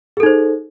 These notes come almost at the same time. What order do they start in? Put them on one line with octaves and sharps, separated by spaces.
G#4 A4 D#4 C5